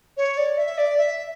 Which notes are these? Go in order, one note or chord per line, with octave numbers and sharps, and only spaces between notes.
C#5
D5
E5
D5
E5